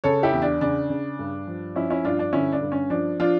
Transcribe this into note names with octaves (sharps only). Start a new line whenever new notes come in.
C#3 A4 C#5
E4 G4
E2
D4
C#3 D4
C#3
G2
F3
F3 C#4 E4
C#4 E4
G2 D4 F4
D4
D3 C#4 E4
D4
G2
C#4
F3 D4
F3 D4 F4